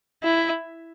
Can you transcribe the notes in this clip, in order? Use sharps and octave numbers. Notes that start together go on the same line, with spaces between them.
E4